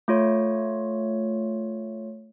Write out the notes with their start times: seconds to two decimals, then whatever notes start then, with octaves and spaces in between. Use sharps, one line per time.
0.08 A3 F4 C#5